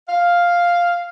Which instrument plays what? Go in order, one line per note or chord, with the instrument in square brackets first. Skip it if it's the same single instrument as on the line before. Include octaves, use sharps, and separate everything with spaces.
[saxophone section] F5